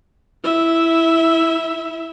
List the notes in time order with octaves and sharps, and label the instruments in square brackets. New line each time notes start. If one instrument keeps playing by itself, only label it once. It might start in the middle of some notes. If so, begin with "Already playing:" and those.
[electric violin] E4 E5